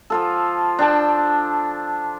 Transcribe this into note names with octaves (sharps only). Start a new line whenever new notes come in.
F3 F4 A4
D4 G5 A5